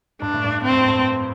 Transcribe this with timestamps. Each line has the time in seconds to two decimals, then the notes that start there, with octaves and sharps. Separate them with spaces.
0.21 G2 D4
0.33 A2
0.44 G2
0.64 A2 C4
0.72 G2
0.80 F2
0.88 G2